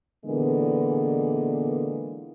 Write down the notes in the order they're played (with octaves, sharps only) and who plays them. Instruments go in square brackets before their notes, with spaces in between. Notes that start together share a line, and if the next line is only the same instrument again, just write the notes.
[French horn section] A#2 D3 E3 G#3 A#3 B3